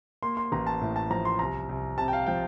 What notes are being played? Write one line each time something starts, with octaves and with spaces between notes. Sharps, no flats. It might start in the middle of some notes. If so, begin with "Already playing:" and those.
A#3 C6
C6
A1 A#5
A5
A2
A5
F3 A#5
C6
C2 A#5
C2
C3 A5
G5
F5
F3 G5